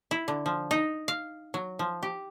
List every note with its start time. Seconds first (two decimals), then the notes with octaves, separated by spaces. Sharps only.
0.11 E4
0.28 D3
0.46 F3
0.71 D#4
1.08 F5
1.54 F#3
1.79 F3
2.03 G4